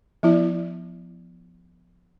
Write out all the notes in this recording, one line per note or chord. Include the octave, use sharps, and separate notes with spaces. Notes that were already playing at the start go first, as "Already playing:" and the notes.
F3 B3 E4 D5